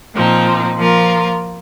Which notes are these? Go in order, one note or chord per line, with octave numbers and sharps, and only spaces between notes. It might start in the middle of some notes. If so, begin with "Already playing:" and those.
A#2 F3 C4 D#4
F3 A#3 F4 A#4